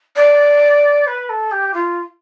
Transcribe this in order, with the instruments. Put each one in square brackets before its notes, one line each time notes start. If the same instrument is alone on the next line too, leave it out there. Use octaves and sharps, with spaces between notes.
[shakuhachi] D5
B4
A4
G4
F4